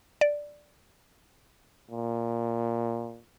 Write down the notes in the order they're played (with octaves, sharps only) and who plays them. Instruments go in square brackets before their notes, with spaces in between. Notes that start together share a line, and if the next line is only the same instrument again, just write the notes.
[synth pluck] D5
[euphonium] A#2